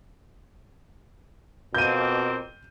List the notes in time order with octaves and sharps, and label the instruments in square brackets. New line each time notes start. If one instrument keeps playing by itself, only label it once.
[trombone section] F2 A#3 C4 [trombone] B2 [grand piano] G6 D#7